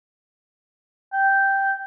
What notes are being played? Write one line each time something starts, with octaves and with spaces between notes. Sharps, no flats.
G5